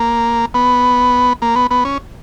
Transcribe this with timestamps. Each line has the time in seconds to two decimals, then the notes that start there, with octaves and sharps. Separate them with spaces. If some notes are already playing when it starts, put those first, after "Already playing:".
Already playing: A#3
0.54 B3
1.42 A#3
1.56 B3
1.71 B3
1.85 C#4